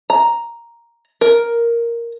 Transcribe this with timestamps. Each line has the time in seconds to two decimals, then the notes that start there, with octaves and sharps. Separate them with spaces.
0.10 A#5
1.21 A#4